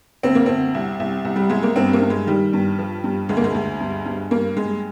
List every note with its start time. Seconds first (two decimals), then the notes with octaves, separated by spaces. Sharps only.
0.23 D2 C4
0.35 A#3
0.46 D2 C4
0.74 C2
1.00 C2
1.25 C2
1.36 G3
1.50 C2 G#3
1.63 A#3
1.76 G2 C4
1.93 A#3
2.02 G2
2.10 G#3
2.27 D#3 G3
2.53 G2
2.79 F3
3.04 G2
3.29 D2 G#3
3.37 A#3
3.44 G#3
3.55 D2
3.80 G2
4.06 G2
4.31 G2 A#3
4.57 G2 G#3